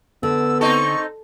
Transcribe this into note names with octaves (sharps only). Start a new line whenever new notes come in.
D3 B3 E6
C4 D#4 A4 C#6